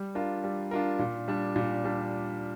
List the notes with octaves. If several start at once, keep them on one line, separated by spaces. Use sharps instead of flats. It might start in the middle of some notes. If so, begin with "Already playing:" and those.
Already playing: G3
D4 F4 A#4
G3
D4 F4 A#4
A#2
G3 D4
A#2
G3 D4